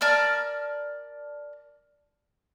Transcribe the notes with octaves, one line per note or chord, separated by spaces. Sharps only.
A#4 D5 A5 F6